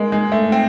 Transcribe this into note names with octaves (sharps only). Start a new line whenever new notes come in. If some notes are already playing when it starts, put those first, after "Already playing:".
Already playing: G#3 A#3
G#3
A3
C4